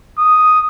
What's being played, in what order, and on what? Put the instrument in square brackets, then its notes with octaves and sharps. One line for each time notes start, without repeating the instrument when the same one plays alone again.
[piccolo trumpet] D#6